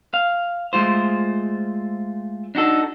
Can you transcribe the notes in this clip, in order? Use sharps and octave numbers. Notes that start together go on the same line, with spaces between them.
F5
G#3 A3 F4 C5
D4 D#4 F#4 A4